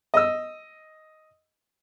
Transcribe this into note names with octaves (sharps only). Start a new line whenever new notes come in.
D#5 E6